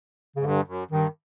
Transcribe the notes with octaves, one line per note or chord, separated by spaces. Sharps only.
C#3
G#2
G2 D3
F#2
G2 D#3